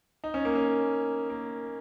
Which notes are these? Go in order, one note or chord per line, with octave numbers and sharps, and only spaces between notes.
D#4
C#4
A#3
C#4
A#3